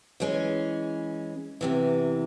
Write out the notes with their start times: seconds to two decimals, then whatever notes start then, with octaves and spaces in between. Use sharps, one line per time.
0.20 E3 G#3 C#4
1.61 E2 C3 E3